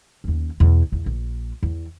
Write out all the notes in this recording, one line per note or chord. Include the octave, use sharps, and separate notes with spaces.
D#2 C#4
E2 B2
E2 A#2
A#1
E2